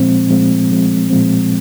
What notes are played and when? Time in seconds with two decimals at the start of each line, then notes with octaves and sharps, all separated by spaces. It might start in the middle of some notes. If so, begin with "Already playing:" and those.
Already playing: A#2 F3 G#3 C4
0.29 A#2 F3 G#3 C4
0.69 A#2 F3 G#3 C4
1.10 A#2 F3 G#3 C4